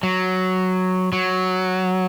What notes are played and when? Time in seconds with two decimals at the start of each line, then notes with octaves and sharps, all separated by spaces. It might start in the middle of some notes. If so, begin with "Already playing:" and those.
0.03 F#3
1.13 F#3